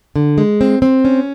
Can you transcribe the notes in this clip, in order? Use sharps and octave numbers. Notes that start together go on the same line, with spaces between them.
D3
G#3
C4
C4
C#4